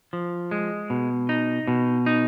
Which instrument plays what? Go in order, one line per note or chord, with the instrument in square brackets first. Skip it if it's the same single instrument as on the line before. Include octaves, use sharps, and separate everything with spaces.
[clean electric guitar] F3
G#3
B2
D#4
B2
D#4